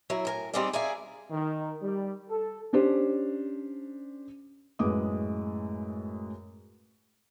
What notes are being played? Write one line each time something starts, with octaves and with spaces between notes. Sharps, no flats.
F#3 E4 A#4
A2 A#4 G#5
G3 C4 D#4 G4 G#4 D5
G#4 A#4 D5 E5 F5 G#5
D#3
G3
A4
C#4 D4 G4 C5
F#2 A2 G#3 B4 D6 D#6